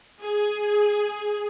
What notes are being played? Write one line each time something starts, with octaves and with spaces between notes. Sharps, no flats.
G#4